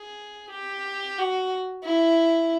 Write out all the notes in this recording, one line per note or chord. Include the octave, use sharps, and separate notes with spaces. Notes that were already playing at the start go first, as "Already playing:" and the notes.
Already playing: G#4
G4
F#4
E4